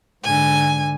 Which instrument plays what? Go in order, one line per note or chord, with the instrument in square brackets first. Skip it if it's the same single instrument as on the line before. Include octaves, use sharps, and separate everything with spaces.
[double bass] G#2 D3 [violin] G#5